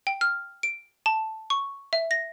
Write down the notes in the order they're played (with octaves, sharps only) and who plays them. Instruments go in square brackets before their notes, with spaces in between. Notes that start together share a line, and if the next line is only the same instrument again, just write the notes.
[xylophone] G5
F6
D7
A5
C#6
E5
A#6